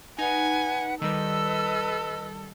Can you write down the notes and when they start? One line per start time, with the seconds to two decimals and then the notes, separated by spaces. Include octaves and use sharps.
0.19 D#4 B4 F#5 G#5
1.02 D#3 G3 A4 B4 D#5 E6